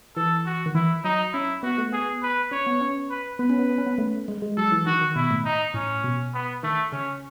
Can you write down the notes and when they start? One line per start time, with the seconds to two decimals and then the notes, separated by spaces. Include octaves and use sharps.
0.16 E3 A4
0.46 F#4
0.66 D#3
0.75 E3 E4
1.04 F#3 D#4
1.33 C#4 E4
1.63 B3 F#4
1.78 A3
1.92 B3 G#4
2.22 B4
2.51 C#4 C#5
2.67 B3
2.81 C#4
3.10 B4
3.39 B3 B4
3.50 C#4
3.59 B3
3.69 B3
3.78 C#4
3.87 B3
3.98 A3
4.28 G#3
4.42 G#3
4.57 F#3 A4
4.72 E3
4.86 D#3 F#4
5.01 D#3
5.15 B2 E4
5.31 A2
5.45 D#4
5.74 A2 C#4
6.04 B2
6.34 B3
6.63 D#3 A3
6.92 C#3 C#4